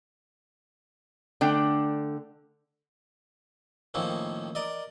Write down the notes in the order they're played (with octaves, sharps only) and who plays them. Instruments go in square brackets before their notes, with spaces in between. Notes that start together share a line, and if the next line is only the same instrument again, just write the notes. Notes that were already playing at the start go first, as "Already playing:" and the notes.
[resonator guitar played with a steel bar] D3 A3 D4 G5
[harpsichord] A2 D#3 F3 A#3 C4 C#4
A#4 D5 D#5